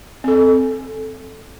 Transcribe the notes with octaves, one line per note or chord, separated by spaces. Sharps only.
C4 A4